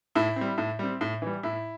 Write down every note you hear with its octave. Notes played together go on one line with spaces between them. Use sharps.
A2 E4
G3 C4
A2
G3 C4
A2
E3 G3
A2 E4